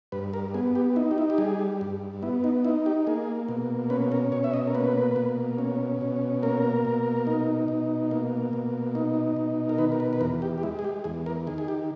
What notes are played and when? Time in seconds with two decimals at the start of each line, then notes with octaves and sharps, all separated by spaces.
0.12 G2 B4
0.33 A#4
0.54 B3 G#4
0.75 G4
0.96 D#4 E4
1.11 G4
1.18 E4
1.30 G4
1.38 G3 G#4
1.81 G2
2.22 B3 E4
2.44 D#4
2.65 D#4 E4
2.86 G4
3.07 A#3 G#4
3.48 B2
3.90 C#4 B4
4.12 A#4
4.32 B2 C#5
4.44 E5
4.54 D#5
4.67 A#4
4.75 A#3 B4
5.16 B2
5.58 C#4
6.01 B2
6.43 A#3 A#4
6.85 B2
7.27 D#4
7.68 B2
8.11 A#3
8.53 B2
8.95 D#4
9.36 B2
9.69 A#4
9.78 D#3 B4
9.92 A#4
10.00 B4
10.13 B4
10.21 E2 A#4
10.42 G4
10.58 G4
10.63 G#3 E4
10.79 G#4
10.84 G4
11.04 E2 G#4
11.26 A#4
11.47 D#3 G#4
11.58 G#4
11.68 G4